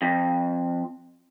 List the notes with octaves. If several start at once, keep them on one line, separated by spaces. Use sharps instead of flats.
F2